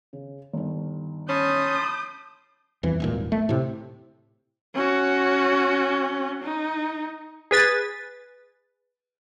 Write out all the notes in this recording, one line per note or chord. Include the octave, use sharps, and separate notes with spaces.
C#3
G1 D#3
C#4 A5 B5 C6 D#6 G6
D#1 F2 E3
D#1 G#1 A#2
A3
A2 C3
C#4 F#4
D#4
G#4 B4 A6